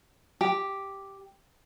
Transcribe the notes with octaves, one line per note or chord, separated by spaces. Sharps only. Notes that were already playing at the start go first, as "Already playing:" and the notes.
G4